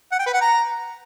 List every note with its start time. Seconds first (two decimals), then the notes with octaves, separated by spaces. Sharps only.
0.12 F#5
0.19 G5
0.26 B4
0.34 F#5
0.41 A#5